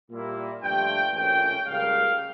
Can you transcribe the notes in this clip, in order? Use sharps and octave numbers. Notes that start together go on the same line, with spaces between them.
A#2 G3 A#3 E4
G2 F3 A3 G5
A#1 A2 F3 C#4 G5
C#2 C#3 G3 A#3 F5